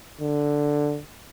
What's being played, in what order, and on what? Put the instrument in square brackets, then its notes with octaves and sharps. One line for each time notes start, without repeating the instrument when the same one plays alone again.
[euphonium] D3